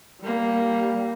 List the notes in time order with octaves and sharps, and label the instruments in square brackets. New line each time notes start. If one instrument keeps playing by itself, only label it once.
[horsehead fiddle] G3 A#3